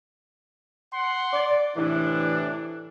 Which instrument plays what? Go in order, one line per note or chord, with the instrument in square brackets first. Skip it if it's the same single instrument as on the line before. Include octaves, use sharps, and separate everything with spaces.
[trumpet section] F#5 C6
[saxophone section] D5
[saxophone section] A2 C3 E3 [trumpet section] D4